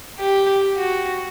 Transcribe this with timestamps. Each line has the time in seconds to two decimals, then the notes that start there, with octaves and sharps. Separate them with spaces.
0.18 G4
0.77 F#4